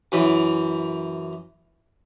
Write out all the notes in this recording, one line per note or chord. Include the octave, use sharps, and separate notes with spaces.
F#2 E3